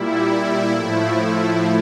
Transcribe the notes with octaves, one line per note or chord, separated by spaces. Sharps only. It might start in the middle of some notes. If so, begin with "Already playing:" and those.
Already playing: A#2 G3 E4
A2 F3 A3 E4